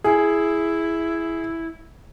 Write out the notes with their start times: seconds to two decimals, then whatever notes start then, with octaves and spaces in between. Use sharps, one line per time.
0.04 E4 G#4